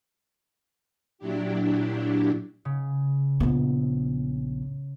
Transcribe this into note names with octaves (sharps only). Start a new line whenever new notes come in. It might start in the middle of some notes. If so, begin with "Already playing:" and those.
A#2 F#3 D4 E4 G4
C#3
A#1 B3